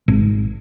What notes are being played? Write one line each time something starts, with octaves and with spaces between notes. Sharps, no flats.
G#1